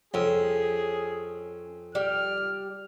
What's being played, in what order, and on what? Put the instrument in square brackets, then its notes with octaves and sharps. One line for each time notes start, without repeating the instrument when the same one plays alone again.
[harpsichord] F2 [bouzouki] C#4 [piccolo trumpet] G#4
[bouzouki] G3 G4 [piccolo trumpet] F6